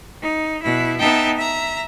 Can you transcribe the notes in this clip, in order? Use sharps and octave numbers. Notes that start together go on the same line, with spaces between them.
D#4
B2 E4
B3 D#4 E5 G5 A5
E5 A#5